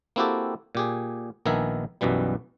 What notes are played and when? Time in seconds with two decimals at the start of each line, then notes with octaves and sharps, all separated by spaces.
0.16 A#3 C4 E4 F#4 G4 A4
0.75 A#2 G4 G#4
1.46 A#1 D#3 B3 A#4 E5 G#5
2.01 B1 F#2 B2 E3 G3